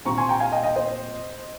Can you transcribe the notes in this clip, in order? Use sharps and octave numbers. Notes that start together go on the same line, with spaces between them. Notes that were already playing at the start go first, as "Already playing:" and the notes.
A#2 G3 C4 A#5 C#6
G#5 C6
G5 A#5
F5 G#5
D#5 G5
D#5 G5
C5 D#5